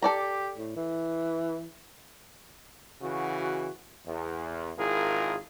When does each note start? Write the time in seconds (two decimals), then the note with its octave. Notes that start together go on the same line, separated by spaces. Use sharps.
0.02 G4 A4 D5 A#5
0.58 A2
0.76 E3
3.02 C#3 E3 F#4
4.06 E2
4.77 G#1 E4 F4 G#4 A#4